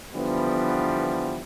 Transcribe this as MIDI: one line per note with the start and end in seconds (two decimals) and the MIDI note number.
0.14 1.41 50
0.14 1.41 52
0.14 1.41 53
0.14 1.41 55
0.14 1.41 59